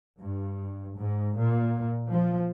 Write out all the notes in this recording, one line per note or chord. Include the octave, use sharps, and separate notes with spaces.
G2
G#2
A#2
F3